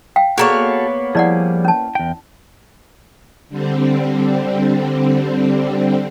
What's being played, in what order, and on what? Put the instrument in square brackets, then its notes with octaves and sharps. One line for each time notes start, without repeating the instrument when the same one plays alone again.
[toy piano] F5 G5
[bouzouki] A#3 B3 C#5 [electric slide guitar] F#4 A4 [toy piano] G#4 A#5
[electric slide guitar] F3 G3 G#4 [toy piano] E4 D5 F#5
[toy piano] C#4 A5
[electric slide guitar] E2 G5
[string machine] D3 G3 C4